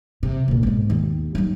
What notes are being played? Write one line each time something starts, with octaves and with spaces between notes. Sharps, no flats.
C3
A#1 A#2
G#2 B2
D#2
F#3 D#4